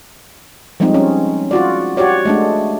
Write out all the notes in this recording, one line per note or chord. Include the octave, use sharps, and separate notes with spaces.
F3 G3 G#3 C4 D#4
C#4
F4 F#4 D5
F#4 G4 C#5 D5
G#3 A3 D4